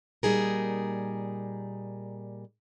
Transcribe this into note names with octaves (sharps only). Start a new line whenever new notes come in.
A#2 G3 D#4 G#4 A#4